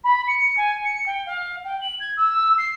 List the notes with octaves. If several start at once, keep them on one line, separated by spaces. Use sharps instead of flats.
B5
C#7
G#5
C#7
G5
F5
G5
F#7
G#6
E6
C7